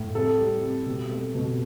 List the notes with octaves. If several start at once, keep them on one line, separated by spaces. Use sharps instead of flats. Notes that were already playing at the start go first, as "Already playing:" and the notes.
Already playing: A2
C3 A4
G3
C3
B2
A3
B2